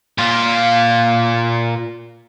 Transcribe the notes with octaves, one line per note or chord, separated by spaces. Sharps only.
A#2 F4